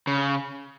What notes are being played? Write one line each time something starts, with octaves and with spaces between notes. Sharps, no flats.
C#3